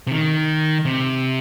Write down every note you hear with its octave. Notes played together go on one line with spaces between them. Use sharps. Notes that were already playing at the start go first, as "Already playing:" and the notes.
C3
D#3
C3